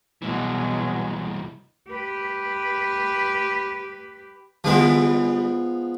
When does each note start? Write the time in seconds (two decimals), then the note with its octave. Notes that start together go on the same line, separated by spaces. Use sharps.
0.22 C2 B2 E3 F#3 G#3
1.89 G4 B4
4.64 D3 F3 G3 G#3 B3 E4